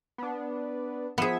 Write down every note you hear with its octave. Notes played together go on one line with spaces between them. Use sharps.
B3 D4
F3 B3 G#4 E5